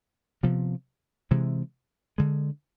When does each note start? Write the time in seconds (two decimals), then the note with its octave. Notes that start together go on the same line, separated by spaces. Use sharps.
0.43 C3 F3 B3
1.31 C3 E3 G#3
2.18 D3 G#3